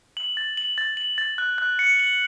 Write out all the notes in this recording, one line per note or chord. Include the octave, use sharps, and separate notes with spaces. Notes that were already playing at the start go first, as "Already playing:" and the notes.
F#7
A6
F#7
A6
F#7
A6
F#6
F#6
C#7
F#7